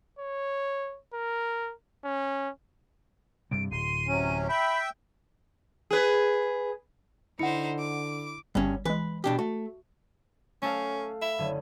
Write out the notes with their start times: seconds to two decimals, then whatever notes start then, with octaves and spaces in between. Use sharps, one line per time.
0.19 C#5
1.13 A#4
2.04 C#4
3.51 G2 C3 G3 D7
3.71 D1 C6 D#7
4.07 C3 F#3 C#4
4.49 E5 G5 B5
5.91 G#4 B4
7.39 D3 D#4 E4 C5 F#5 C#7
7.79 D6
8.55 G1 G2 G3 C#4
8.85 E3 G#3 B4
9.24 B2 D4 G4
9.39 A3 F#4
10.62 A3 C#4 A4 F5
11.21 E5 B5
11.38 F#1 D3 C#4